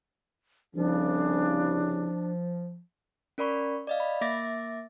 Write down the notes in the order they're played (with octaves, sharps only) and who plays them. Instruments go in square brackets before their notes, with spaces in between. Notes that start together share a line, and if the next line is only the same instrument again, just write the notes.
[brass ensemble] C2 C#3 [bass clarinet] F3 [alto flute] D4
[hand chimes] C#4 A#4 D5 B5 C#6
D5 D#5 F5
B5
A#3 E5 D6 A6 A#6